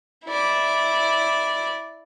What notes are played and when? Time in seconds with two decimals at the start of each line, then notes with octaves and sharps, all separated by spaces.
0.25 E4 D5